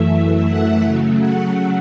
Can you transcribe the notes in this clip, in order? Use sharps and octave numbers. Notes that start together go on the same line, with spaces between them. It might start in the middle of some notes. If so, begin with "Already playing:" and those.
Already playing: F#2 E3 A3 E5
F#5
C#3 F#3 A3
F#5